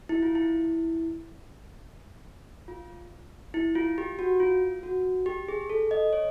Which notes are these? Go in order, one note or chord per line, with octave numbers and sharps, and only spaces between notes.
E4
F4
E4
F4
E4
F4
G4
F#4
F4
F#4
G4
G#4
A4
D#5
C#5